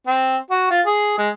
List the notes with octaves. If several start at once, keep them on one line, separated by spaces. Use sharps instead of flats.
C4
F#4
F4
G#4
G#3